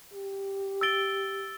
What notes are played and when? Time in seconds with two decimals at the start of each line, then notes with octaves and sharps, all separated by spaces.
0.13 G4
0.81 E6 A6 D7 G7